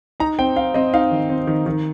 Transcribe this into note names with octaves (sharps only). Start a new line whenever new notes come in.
D#4 A#5
C4 G5
C4 F5
C4 D#5
D#4 F5
D#3
C4
D#3
D#3